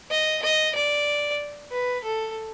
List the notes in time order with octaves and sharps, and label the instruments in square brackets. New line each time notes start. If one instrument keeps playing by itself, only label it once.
[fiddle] D#5
D#5
D5
B4
A4